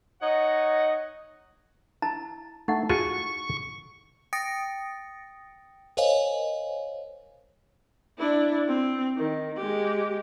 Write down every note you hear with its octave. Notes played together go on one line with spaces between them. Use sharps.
D#4 C#5 D#5 F#5
E4 A5 A#5
A3 D#4 E4 F#5
F4 F#4 G#4 C#6
G5 D#6 A6 A#6 C#7 D7
A#4 C5 C#5 D#5 F5 G#5
D4 E4
C4
D#3
G#3 G4